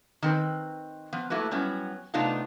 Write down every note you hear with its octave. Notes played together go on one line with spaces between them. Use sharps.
D#3 C4 B4
F3 B3
A3 A#3 E4 F#4 B4
F#3 G3 B3 C#4 E4
C3 A3 B3 D4 D#4 F4